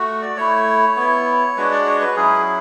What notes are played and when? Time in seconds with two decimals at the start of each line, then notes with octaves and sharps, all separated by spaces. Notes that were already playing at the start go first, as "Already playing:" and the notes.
Already playing: A3 F#4
0.22 D5
0.37 A3 E4 C#5
0.96 B3 E4
1.57 G#3 D4 F#4 B4
1.71 D5
1.86 C#5
2.01 B4
2.16 F#3 C#4 E4 G#4